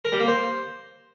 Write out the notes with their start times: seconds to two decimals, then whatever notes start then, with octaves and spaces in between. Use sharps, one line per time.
0.05 A#4
0.12 G3
0.20 A#3
0.27 C5